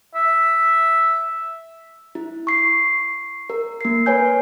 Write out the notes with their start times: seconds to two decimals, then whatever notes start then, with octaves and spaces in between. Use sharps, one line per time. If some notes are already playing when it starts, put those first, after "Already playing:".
0.15 E5
2.15 E4
2.47 C#6 C7
3.50 A#4
3.81 A#3 C7
4.06 B4 C#5 G#5 G6